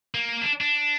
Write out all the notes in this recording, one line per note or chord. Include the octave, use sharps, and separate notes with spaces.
A#3
D4
D4